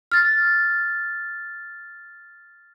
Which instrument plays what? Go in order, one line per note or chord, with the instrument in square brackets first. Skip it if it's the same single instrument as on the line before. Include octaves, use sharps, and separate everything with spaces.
[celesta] F6 A6